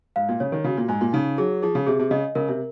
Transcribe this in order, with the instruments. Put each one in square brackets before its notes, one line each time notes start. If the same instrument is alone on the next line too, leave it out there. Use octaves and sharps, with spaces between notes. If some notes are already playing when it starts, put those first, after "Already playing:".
[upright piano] G#2 [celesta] F5
[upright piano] A#2
[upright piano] C#3 [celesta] C#5
[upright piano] D#3
[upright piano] C#3 [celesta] F#4
[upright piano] A#2
[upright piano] G#2 [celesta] G#5
[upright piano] A#2
[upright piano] C#3 [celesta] D#4
[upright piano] F#3 [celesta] G#4
[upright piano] F3 [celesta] G#4
[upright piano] C#3
[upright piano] C3 [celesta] G#4
[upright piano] C3
[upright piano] C#3 [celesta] D#5
[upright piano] C#3 [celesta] A#4
[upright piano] C3